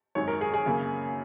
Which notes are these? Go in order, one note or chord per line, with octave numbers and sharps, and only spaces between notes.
G#1 F#2 D#3 G#3 C#5
A#4
G#4
G#4
F#2 C#3 A#3